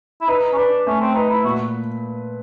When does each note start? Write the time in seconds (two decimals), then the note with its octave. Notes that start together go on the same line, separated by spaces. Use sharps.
0.21 E4
0.28 D#4 B4
0.53 C#4
0.57 D4 B4
0.87 A3 C#4
1.01 C4
1.15 D#4 B4
1.30 E4
1.44 A#2 F#4